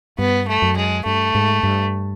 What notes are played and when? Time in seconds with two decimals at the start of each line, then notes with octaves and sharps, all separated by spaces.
0.18 G2 B3
0.48 A3
0.62 F#2
0.77 G#3
1.06 G2 A3
1.35 G#2
1.63 G2